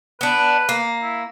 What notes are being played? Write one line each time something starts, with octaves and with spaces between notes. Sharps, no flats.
B3 D4 B4
A#3
E4